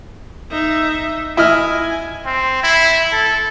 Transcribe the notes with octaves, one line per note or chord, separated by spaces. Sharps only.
D#4 E5
E4 D#5 G#5 F6
C4
E4
A4